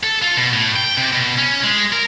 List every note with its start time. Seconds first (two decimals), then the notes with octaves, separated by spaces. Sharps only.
0.03 A4
0.22 F4
0.37 B2
0.53 A2
0.76 G5
0.97 C3
1.12 B2
1.38 C#4
1.63 G#3
1.92 A#4